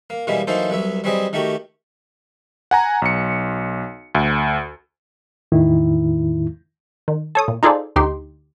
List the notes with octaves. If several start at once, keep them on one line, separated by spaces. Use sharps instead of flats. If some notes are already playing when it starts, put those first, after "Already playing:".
A#3
B2 E3 G3 G#3 A#3 B3
E3 F#3 A#3 D#4 A4 C5
C2 F#3 B3 E5
F#3 G3 C4 G#4 B4 D#5
D#3 A3 F#4 G4 A#5
F#5 G#5 A#5
B1 C#7
D2
E2 A2 D#3 E4
D#3
A4 C#5 D#6
A#2
D#4 F4 G#4 A4 C5 D5
D2 D#4 G4 C6